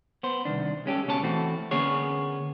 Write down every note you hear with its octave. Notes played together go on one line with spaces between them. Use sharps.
B3 C5
C2 F2 D#3 D4
G#3 C#4 G4 A4
C#2 B2 C#4 E4 A5
E3 A3 C4 F#4
D3 A#3 B3 C#4 G#4 C#5